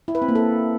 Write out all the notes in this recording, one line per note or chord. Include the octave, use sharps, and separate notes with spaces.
E4
B4
C4
A#3
A4